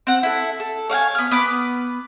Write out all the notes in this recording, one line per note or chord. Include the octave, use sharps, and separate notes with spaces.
C4 F#5
E4 A4
A4
C#5 F5 F#5 G#5
B3 F6
B3 B4 D6